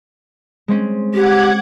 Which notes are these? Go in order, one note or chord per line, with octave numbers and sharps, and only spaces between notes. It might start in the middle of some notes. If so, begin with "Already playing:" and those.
G#3 C4 C#4
G4 F#5 D6 G#6